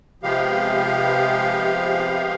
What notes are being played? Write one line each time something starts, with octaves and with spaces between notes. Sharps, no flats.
C3 F3 G#3 B3 G4 F5